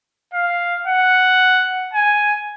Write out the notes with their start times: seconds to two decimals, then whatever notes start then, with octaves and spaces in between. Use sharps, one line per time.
0.33 F5
0.87 F#5
1.93 G#5